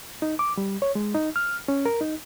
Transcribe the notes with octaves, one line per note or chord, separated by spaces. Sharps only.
D#4
D6
G3
C#5
G#3
D#4
F6
C#4
A#4
D#4